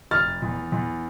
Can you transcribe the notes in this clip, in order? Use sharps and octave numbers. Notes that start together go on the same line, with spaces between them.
F1 F6 A6
E2
E2